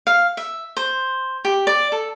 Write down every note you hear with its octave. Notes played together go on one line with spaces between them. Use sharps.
F5
E5
C5
G4
D5
A4